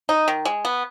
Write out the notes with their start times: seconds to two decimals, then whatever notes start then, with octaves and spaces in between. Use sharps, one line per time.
0.09 D#4
0.28 D#3
0.45 G#3
0.65 B3